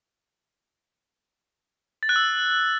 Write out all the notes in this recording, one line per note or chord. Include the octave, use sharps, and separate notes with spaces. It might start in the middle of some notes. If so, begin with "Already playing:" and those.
A6
F#6
E6